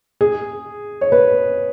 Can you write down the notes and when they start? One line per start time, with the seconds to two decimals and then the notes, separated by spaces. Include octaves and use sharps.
0.21 G#4
1.01 C#5
1.12 B4